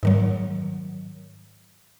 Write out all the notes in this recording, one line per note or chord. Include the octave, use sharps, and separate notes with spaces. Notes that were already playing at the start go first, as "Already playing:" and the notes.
G#2 D#3 F#3